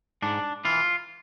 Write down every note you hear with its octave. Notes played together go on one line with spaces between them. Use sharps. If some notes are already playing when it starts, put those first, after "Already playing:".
G#2 D4
E3 F4